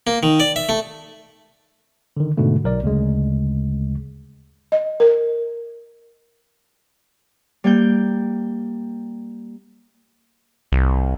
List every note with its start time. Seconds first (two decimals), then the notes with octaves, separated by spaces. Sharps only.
0.07 A#3
0.23 D#3
0.40 D5
0.56 E5
0.69 A3
2.17 D3 D#3
2.37 G#2 B2 D3 A3
2.64 B1 A#4 D5
2.84 D2 C#3 G#3
4.72 D#5
5.00 A#4
7.64 G3 A#3 G5 G6
10.72 C2